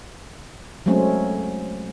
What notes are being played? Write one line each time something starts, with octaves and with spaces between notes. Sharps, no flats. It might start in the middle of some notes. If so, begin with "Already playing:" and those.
F#3 G#3 A3 C4 C#4